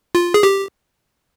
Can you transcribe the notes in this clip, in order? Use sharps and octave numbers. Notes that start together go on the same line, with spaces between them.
F4
G#4
G4